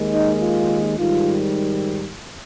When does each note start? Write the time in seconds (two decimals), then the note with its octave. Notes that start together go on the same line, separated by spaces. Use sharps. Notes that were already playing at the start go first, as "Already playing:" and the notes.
Already playing: D#2 D#3 G#3
0.10 D#4
0.39 F4
0.97 G#2 D#3 G3 F4